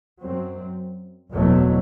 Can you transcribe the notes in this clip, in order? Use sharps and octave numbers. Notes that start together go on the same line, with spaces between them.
F#2 F#3 C4
F#1 E2 B2 F#3 A3